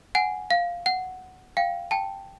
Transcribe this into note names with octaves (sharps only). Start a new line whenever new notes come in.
F#5 G#5
F5
F#5
F5 G5
G5 A5